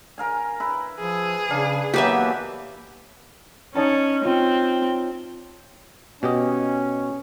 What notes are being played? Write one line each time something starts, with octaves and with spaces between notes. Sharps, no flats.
A#4 F5 G#5
E4 B4
F3 G#4
C#3 D4 F5
B2 E3 F#3 A#3 G4 B4 E5
C#4 D#4 C#5 A5
C4 F4
B2 C#4 G4 D#5